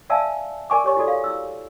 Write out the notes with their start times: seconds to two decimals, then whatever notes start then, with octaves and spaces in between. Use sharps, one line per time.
0.10 D5 E5 F5 G#5 A5 E6
0.70 A#4 D5 G#5 C#6 D6
0.84 G4 C#5 C#6
0.96 E4 F#4 A4 D5
1.08 F5
1.24 E4 E6